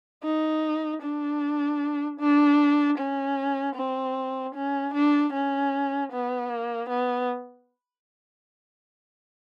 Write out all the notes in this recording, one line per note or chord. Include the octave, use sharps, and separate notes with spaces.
D#4
D4
D4
C#4
C4
C#4
D4
C#4
B3
A#3
B3